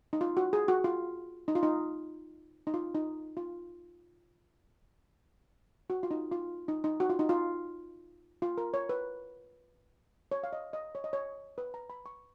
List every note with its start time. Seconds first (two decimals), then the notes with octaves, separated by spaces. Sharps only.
0.13 D#4
0.21 F4
0.37 F#4
0.53 G#4
0.68 F#4
0.84 F4
1.48 D#4
1.55 F4
1.63 D#4
2.67 D#4
2.74 F4
2.95 D#4
3.37 F4
5.90 F#4
6.03 F4
6.11 D#4
6.32 F4
6.68 D#4
6.84 D#4
7.00 F#4
7.10 F4
7.19 D#4
7.29 F4
8.42 F4
8.58 A#4
8.74 C#5
8.89 B4
10.32 C#5
10.44 F5
10.53 D#5
10.73 D#5
10.95 C#5
11.04 D#5
11.13 C#5
11.58 B4
11.74 A#5
11.90 B5
12.06 C#6